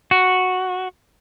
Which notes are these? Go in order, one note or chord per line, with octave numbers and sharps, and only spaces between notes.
F#4